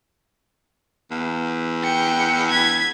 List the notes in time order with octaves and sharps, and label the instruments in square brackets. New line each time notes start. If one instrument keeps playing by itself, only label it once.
[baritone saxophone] E2
[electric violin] G5 C#7
G#6 B6